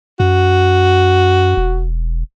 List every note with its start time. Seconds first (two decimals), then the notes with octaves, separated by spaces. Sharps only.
0.20 F#2 F#4
1.57 E1